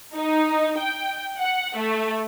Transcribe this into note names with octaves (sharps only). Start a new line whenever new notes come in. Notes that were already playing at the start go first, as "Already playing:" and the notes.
D#4
G5
F#5
A3